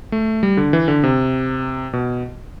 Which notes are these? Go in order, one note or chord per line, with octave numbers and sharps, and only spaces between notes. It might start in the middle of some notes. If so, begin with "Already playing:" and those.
A3
G3
D3
E3
D3
C3
B2